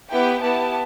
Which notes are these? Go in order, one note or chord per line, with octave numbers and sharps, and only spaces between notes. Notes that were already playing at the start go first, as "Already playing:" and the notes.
B3 E4 G4 G5
B3 E4 G4 A5